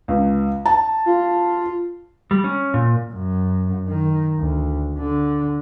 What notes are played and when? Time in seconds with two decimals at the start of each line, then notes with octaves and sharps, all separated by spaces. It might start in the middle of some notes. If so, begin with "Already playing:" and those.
0.08 C#2
0.66 A5
1.06 F4
2.31 G3
2.44 C#4
2.74 A#2
3.13 F#2
3.88 D#3
4.39 D2
4.99 D3